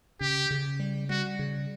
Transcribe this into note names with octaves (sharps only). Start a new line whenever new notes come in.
C#3 G4
C#3
G3
G3 F#4
C#3